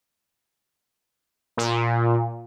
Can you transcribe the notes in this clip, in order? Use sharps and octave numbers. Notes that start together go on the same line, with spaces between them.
A#2